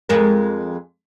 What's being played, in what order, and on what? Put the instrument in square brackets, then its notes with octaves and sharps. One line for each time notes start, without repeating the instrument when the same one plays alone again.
[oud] F2 G#3 A#4